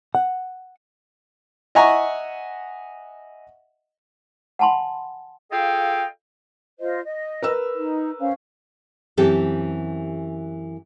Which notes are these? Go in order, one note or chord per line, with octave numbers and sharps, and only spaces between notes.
F#5
D#5 E5 F#5 G#5 A#5 C#6
F#5 G#5 A5 B5 C6
F4 G#4 A4 D#5 F5 G5
F4 C5 D#5
D#5
A#4 B4 E6
D#4
C#4 C5 F5
F#2 E3 C4 G4 A4